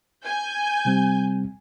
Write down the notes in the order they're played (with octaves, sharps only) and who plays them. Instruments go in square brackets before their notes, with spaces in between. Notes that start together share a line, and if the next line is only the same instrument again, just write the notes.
[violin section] G#5 G6
[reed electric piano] C3 G3 C4